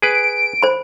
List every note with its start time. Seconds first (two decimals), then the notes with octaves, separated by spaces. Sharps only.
0.02 G#4 B4 D7
0.63 C5 B5